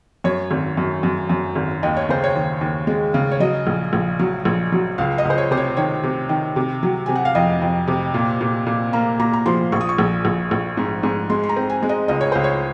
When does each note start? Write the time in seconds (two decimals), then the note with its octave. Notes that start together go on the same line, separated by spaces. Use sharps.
0.24 F#2 C#5
0.51 G#1
0.77 F#2
1.03 F#2
1.29 F#2
1.56 G#1
1.83 D#2 D#5
1.97 C#5
2.09 C#3 C5
2.24 C#5
2.35 D#2
2.61 D#2
2.87 G#3
3.14 C#3
3.32 C#5
3.40 F#3 D#5
3.67 A#1
3.93 A#1
4.19 F#3
4.45 A#1
4.72 F#3
4.98 C#2 F5
5.18 D#5
5.25 C#2 C5
5.38 C#5
5.51 C3 C5
5.57 C#5
5.77 D#3 C#5
6.03 C3
6.29 D#3
6.56 C3
6.83 F#3
7.06 C3 G#5
7.15 F#5
7.25 F5
7.35 F2 D#5
7.62 F2
7.88 C3
8.14 A#2
8.41 A#2
8.66 A#2
8.93 A#3 A#5
9.19 A#2 A#5
9.33 A#5
9.46 F3 C6
9.72 A#1 C#6
9.81 D#6
9.89 C#6
9.98 A#1
10.25 A#1
10.51 A#1
10.77 G#2
11.03 G#2
11.30 G#3 C6
11.43 C6
11.49 A#5
11.56 C4
11.70 G#5
11.83 G#3
11.89 D#5
12.08 C#2 D#5
12.21 C#5
12.32 C#2 C5
12.44 C#5